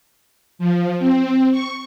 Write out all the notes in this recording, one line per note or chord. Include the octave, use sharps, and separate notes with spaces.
F3
C4
C#6